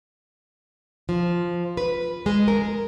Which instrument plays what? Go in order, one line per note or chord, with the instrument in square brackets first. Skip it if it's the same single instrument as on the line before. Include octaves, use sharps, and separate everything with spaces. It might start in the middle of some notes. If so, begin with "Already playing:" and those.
[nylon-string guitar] F3
B4
G#3
A#4